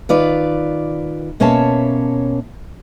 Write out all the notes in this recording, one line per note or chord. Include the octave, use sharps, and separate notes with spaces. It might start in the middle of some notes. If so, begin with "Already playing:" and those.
D#3 F4 B4 D5
B2 A#3 C#4 C#5 E5 A5